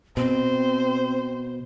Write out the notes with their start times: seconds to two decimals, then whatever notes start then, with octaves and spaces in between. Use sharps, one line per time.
0.17 B2 C4 C5